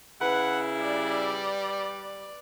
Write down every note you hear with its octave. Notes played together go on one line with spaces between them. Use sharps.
C#3 E4 B4 F#5
G3 D5